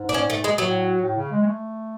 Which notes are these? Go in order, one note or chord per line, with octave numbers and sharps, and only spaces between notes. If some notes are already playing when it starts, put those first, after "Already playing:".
Already playing: G#2
D4
C#4
A3
G#3
A2 F#3
A2
C#3
G#3
G#3
A3